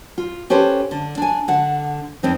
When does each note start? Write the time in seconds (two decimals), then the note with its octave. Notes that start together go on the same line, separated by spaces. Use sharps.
0.18 F4
0.50 C#4 G4 A4 B4 C5
0.91 D3
1.18 D4 G#5
1.48 D3 F#5
2.23 F2 C4 D#4